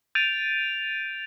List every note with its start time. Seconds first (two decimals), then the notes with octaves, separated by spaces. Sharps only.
0.15 G6 A6 D7 D#7 F7